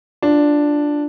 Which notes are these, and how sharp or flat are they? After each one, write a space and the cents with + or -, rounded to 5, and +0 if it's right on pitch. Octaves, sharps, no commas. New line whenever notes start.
D4 +0 F4 +0